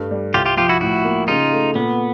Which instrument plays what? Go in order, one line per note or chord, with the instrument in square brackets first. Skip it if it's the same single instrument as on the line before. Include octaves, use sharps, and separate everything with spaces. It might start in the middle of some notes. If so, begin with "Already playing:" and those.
Already playing: [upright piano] G2 A3
G3
[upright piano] C2 [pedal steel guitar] F4 G4
[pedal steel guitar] F4 G4
[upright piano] F3 [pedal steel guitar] F4 G4
[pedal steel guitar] E4 F#4
[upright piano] A2 [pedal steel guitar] E4 F#4
[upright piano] A#3
[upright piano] C#3 [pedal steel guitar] D#4 F4
[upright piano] A3
[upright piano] A#2 [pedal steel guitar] B3